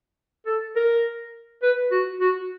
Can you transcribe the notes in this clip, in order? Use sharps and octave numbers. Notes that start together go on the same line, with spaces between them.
A4
A#4
B4
F#4
F#4